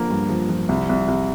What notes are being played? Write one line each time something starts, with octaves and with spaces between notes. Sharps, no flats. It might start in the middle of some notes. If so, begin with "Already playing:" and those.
Already playing: D3 F3 A#3
G2
F3
F3
C2
C2
C2